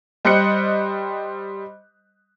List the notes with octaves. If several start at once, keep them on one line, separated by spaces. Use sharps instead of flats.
G3 C5 D#5 F#6 C#7